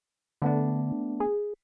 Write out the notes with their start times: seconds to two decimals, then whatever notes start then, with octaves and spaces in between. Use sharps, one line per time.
0.42 D3 A3 B3 D4
1.20 G#4